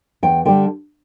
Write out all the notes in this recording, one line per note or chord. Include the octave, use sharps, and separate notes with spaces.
E2 G5
D3 G3 G5